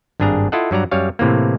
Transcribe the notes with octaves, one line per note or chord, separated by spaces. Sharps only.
G#1 G2 D4 G#4 A#5
E4 F4 A4 D#5 F#5
G2 F#3 D5 A#5
F#2 G3 C#5 F5
A2 C3 E3 A#3